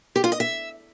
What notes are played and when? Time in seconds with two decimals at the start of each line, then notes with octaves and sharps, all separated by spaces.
0.16 G4
0.24 F4
0.32 D#5
0.40 E5